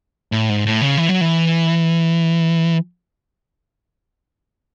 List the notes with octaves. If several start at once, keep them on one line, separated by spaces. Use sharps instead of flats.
A2
G#2
A2
C#3
E3
F#3
E3